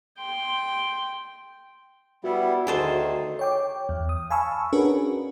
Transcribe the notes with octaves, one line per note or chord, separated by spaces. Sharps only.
G5 C6
G3 B3 E4 F#4
D2 D#3 G#4 A4 C5
C#5 G5 D6
E2
D#6
F5 G#5 A5 B5 C#6 E6
C#4 D4 F#4 G#4 A#4 B4